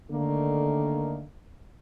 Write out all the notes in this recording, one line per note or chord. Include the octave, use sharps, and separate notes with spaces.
D3 D#3 A3 A#3